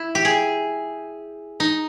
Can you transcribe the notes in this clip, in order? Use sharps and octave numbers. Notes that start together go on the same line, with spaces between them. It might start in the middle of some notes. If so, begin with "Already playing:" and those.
Already playing: E4
G4
G#4
D#4